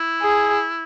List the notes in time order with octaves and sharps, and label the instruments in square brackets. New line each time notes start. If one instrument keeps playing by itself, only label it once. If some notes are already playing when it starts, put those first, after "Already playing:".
Already playing: [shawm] E4
[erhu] G#4